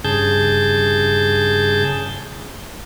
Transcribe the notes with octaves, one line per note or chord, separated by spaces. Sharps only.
G2 C#3 G#4 A5 G6